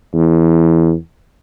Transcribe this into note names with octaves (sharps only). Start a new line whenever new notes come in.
E2